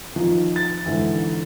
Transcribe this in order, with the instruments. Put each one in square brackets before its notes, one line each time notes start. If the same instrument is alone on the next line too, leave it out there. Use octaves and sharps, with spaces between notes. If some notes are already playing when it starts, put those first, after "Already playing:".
[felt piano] D#3 [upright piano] F3
[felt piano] A6
G#2 D3 E3